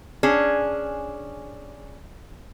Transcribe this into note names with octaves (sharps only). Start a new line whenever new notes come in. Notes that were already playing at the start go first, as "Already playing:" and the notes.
C#4 D4 G#4